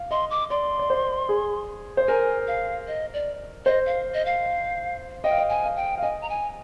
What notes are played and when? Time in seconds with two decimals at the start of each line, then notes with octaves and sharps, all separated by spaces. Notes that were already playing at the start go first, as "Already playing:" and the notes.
Already playing: F5
0.11 D#5 C6
0.31 D6
0.50 D5 C6
0.79 D5
0.90 C5
1.29 G#4
1.97 C5
2.08 A#4 G#5
2.48 F5
2.87 D#5
3.14 D5
3.66 C5 D#5
3.86 F5
4.14 D#5
4.26 F5
5.24 D#5 G5
5.31 F5
5.38 D#5
5.49 G#5
5.63 F5
5.76 G5
5.98 F5
6.02 D#5 G#5
6.21 A#5
6.29 G#5